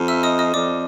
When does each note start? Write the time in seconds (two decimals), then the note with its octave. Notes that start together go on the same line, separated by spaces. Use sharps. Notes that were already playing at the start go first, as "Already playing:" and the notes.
Already playing: F2
0.08 E5 E6
0.23 D#5 D#6
0.39 D#5 D#6
0.54 F2 D5 D6